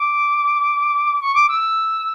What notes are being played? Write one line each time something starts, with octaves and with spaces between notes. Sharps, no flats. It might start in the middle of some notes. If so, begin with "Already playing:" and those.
Already playing: D6
C#6
D6
E6